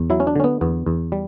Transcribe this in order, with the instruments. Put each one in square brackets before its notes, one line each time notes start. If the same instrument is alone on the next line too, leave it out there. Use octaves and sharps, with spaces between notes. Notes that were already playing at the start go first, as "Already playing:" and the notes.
Already playing: [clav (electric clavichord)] E2
F#3 E4
C#4
D4
D3 C#4
B3
E2 B3
E2
G3